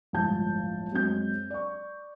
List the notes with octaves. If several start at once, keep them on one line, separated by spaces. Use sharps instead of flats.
G1 C#2 A2 F3 A5 G6
F#2 F#3 G#3 C4 G6
D5 C#6